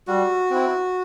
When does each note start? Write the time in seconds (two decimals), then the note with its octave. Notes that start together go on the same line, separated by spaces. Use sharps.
0.07 G3 F#4
0.51 C4 E4